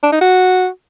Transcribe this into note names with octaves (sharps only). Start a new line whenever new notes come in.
D4
D#4
F#4